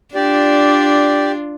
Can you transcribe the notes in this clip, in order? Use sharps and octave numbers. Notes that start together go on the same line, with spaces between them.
D4 F4 G4 D5